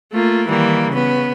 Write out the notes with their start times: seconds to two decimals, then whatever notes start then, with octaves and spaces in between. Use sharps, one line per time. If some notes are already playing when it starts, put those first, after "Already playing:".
0.12 A3 A#3 F4
0.47 D#3 E3 G3 A#3
0.89 C#3 B3